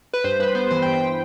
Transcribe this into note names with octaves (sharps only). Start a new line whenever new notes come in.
B4
G2 C5
G2 B4
B3 C5
E3 C5
G5
G2
G5